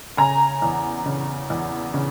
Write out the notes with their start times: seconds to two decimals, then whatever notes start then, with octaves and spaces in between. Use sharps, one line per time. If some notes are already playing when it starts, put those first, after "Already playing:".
0.17 C#3 G#5 A#5
0.62 E2
1.06 C#3
1.50 E2
1.94 C#3